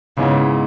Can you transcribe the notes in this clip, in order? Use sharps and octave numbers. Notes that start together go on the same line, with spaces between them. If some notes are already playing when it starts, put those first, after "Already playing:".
G#2 C#3 G#3 B3 E4